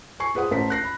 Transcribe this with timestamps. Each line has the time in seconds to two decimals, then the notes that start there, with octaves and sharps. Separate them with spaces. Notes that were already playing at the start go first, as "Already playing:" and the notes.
0.20 G#5 C#6 C7
0.35 G#4 B4 C5 F#5 D#6
0.51 A1 A#4 C5 A5 B6
0.70 F#6 A#6 C7
0.84 B5